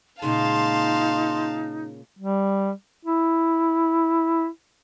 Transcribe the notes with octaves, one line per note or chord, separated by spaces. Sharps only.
A#2 C#3 G#3 D#4 F5 A5 C6
G3
E4